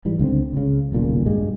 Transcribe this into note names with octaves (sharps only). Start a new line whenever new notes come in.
G#2 E3 G3
C#2 D3 A#3 C4
C#2 C#3
D#1 B1 A#2 C#3
G2 G3 G#3